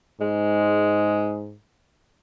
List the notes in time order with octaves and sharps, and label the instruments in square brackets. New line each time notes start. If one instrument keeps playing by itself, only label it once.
[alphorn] G#2 [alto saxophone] G#3